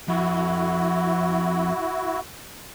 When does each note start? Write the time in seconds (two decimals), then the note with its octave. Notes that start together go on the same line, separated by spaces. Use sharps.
0.08 F2 E4 F#4